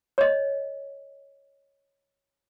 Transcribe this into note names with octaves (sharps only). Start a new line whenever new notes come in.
C#5 D#5